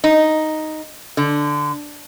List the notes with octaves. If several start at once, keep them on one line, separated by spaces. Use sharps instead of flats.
D#4
D3